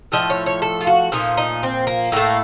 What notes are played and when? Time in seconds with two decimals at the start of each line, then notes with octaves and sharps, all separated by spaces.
0.12 A2 F3 A3 D#5
0.30 C#5
0.46 C#5
0.62 A4
0.81 F4
0.87 F#4
1.12 A#2 F3 A3 D#4
1.37 D#4
1.63 C4
1.87 A#3
2.12 A2 A3 A#3